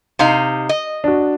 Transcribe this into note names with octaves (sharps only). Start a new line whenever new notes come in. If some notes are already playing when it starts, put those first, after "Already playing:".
C3 D#4 F5
D#5
D4 F#4